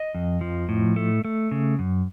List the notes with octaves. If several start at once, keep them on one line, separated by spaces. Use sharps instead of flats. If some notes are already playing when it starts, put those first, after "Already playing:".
Already playing: D#5
F2
F3
A2
A3
A3
C#3
F#2